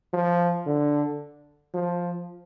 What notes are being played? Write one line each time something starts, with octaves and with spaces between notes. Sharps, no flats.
F3
D3
F3